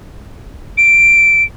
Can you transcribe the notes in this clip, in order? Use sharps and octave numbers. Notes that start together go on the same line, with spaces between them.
D7